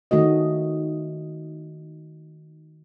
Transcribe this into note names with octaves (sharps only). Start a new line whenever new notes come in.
D#3 A3 F#4 D#5